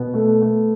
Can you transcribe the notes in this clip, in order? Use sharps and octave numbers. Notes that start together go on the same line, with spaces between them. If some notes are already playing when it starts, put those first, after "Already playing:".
Already playing: B2 B3
A3
A3